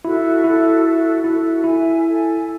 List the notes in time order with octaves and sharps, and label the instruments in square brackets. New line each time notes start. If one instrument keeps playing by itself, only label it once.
[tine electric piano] E4 [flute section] F#4 A4 E5
[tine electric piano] E4 [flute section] F#4 A4 E5
[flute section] F#4 A4 E5
[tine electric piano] E4 [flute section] F#4 A4 E5
[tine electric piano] E4 [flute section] A4 E5 G#5
[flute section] A4 E5 G#5